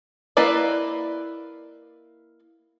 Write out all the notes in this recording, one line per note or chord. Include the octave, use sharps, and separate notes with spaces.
A#3 E4 B4 D5 D#5